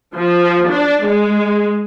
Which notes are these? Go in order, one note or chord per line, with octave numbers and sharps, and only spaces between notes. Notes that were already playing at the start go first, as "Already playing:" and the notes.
F3
D4
G#3